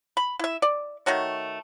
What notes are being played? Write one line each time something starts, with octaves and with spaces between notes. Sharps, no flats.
B5
E4 E5
D5
D#3 A3 F#4 C#5